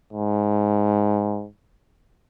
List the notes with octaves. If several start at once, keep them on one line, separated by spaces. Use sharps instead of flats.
G#2